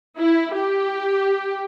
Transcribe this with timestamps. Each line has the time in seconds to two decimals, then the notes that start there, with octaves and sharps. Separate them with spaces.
0.20 E4
0.55 G4